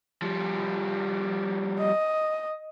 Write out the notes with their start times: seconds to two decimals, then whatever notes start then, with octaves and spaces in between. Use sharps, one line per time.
0.22 F3 G3
1.80 D#5